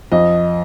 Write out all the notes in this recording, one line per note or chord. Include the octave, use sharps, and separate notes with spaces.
F2 D#5